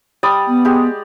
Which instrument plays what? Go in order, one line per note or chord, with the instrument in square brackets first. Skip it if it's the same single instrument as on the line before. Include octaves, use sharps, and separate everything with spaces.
[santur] G3 D5 D#6
[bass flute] B3
[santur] G#3 G4